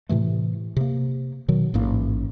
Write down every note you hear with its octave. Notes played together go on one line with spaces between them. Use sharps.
A2 C3 E3 A3
C3 A#3
B2 D#3 F#3
A1 G#2 A#3